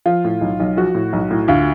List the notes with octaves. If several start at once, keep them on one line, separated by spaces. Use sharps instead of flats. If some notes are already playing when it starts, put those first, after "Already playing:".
F3 F4
A2
B1
B1
F3 F#4
A2
B1
A2
D2 F4